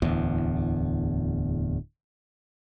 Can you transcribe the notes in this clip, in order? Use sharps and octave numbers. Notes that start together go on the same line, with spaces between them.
D1 E2